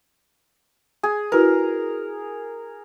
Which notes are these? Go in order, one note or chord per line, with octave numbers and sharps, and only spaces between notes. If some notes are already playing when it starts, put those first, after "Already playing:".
G#4
E4 F#4 A#4 B4